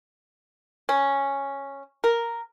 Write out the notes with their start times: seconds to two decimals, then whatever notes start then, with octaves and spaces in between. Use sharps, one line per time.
0.89 C#4
2.04 A#4